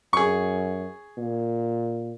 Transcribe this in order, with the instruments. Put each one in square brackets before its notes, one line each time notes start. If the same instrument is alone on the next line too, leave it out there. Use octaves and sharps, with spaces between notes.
[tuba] F#2 [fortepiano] G#4 C#6
[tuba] A#2